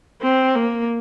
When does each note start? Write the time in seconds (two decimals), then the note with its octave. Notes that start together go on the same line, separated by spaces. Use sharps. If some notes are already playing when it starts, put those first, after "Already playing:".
0.22 C4
0.55 A#3